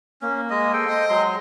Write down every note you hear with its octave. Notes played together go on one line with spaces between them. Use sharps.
A#3 C#4
G#3 D#5
A4 C5 G5
D#5
F#3 G#3 C6